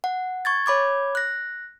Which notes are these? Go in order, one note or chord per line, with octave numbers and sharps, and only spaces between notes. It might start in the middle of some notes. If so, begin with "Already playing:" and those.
F#5
C#6 G#6 A6
C#5 B5 D6 G#6
F#6 A#6